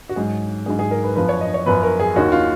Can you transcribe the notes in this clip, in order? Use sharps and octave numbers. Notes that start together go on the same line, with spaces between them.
F#4
G#2 F#3 C#4 G#4
G#2 F#3 C#4 G#4
G#4
A#4
B4
F#2 F3 B3 B4
C#5
D#5
C#5
F#2 F3 B3 B4
A#4
G#4
D#2 D#3 A#3 C#4 F#4
F4